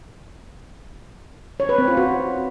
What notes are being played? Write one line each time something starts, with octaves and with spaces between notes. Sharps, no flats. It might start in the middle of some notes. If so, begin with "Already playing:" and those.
C#5
B4
C4
F4
F#4